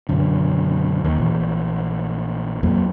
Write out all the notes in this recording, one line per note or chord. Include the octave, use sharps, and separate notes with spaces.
B1 F#2 D3
D#2
A#1 E3
F2 F#3 A#3